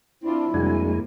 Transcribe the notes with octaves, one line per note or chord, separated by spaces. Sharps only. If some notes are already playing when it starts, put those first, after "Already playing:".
C4 D4 E4 F4
F2 C3 G3 G#3 A#3 D4 F#4 G#5